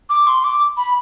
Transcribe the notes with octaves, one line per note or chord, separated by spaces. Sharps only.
D6
C6
D6
B5